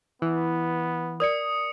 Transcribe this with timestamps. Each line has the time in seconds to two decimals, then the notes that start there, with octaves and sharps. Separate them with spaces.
0.22 E3 B3
1.20 A#4 D5 D#6 C#7